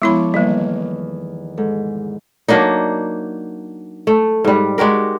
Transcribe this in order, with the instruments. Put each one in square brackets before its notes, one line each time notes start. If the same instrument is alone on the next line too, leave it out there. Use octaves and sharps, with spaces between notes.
[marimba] F3 B3 [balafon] G#3 E4 B5 [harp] A4 C#5 D6
[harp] E2 D#3 [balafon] G3 A#3
[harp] G#2 [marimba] A4
[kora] F#3 A#3 D4 D#4
A3
G#2 G3
G#3 F#4 G4 A#4